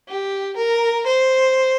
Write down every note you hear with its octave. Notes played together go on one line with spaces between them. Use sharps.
G4
A#4
C5